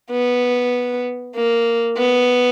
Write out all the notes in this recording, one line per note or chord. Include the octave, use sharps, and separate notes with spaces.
B3
A#3
B3